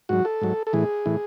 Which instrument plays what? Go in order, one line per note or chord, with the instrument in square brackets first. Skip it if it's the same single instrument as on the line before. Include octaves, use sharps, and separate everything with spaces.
[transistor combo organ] G#2 F#3 F#4
A4
G#2 F#3
A4
A2 E3 G#4
A2 E3